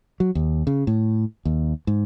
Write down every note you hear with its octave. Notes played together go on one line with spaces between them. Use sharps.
F#3
D#2
C#3
A2
D#2
G#2